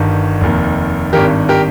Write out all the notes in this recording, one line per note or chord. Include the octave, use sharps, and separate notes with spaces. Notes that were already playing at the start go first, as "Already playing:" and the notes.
Already playing: G1 G2 D#3
F1 D#2 D#3
G#1 G2 D#3 G4 A#4
G4 A#4